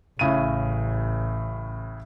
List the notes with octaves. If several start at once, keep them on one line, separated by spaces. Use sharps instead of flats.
A1 A2 C#3 D#7